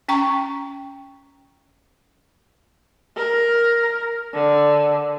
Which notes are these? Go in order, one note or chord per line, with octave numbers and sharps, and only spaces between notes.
C#4 G5 A#5 C#6
A#4
D3